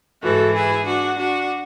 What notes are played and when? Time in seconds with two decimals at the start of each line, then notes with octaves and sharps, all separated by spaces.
0.23 G#2 E3 F#4 A4
0.55 E4 G#4
0.86 D4 F#4
1.19 D4 F#4